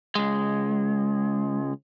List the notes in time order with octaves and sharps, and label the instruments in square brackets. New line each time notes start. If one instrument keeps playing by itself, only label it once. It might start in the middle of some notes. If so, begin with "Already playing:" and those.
[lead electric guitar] C#2 G#3